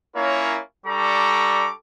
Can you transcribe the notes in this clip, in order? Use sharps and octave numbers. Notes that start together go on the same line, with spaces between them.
A#3 C#4 E4 F4 A#4 C#5
G3 D4 A4 A#5 C#6 D6